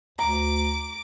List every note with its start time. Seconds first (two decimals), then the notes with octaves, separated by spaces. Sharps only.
0.19 D2 A#5 D6